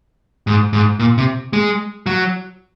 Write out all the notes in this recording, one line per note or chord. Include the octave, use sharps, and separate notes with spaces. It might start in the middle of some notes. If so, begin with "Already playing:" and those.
G#2
G#2
A#2
C3
G#3
F#3